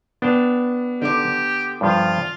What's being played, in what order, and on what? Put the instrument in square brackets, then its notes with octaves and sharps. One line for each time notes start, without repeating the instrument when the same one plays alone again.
[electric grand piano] B3 [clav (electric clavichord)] D4 G5 A5
[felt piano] D3 D6 [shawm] G4
[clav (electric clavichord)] G2 F3 [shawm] F4